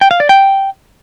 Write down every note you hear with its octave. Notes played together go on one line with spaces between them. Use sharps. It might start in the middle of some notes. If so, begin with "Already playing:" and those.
G5
F5
D5
G5